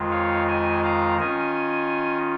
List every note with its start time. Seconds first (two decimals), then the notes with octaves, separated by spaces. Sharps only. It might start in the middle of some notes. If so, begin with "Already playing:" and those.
Already playing: F2 D#3 G#3 F4
0.11 C#5 F5
0.47 D#5 G#5
0.83 F5 A#5
1.20 D#3 C#4 F4 D#5 G#5